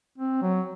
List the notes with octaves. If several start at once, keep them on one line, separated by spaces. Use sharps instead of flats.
C4
F#3